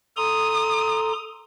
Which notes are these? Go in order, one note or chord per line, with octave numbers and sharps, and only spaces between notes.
A4 A#5 C6 D#6